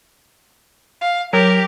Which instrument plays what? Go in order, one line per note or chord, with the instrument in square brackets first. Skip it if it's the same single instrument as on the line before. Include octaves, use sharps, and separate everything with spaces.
[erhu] F5
[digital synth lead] F#3 [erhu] G4 [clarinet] A#4